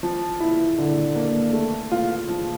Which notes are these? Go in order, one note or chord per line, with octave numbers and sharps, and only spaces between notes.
F3
E4
D3
A#3
A3
F4
F3